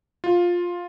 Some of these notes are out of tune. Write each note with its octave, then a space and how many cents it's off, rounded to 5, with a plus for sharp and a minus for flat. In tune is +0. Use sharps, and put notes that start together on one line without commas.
F4 +10